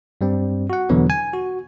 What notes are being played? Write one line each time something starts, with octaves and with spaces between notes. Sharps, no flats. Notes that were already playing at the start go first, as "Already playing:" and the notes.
G2 G3 C4
F#4 F#5
E2 B2 D3 E3 F#3 B3
G#5
F#4